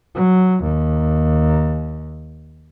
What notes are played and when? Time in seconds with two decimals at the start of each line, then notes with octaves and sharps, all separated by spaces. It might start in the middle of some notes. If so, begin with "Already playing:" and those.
0.15 F#3
0.63 D#2